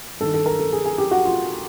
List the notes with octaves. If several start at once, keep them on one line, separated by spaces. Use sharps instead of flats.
G2 D#3 A4
A4
A#4
A4
G#4
G#4
G4
F#4
F4